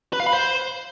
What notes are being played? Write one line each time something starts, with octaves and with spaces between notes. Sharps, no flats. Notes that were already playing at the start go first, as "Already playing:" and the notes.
B4
F5
B5
C5